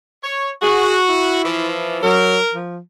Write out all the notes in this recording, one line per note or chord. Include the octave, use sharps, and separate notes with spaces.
C#5
F#4 G#4
E4
E3 F3
F#3 A#4
F3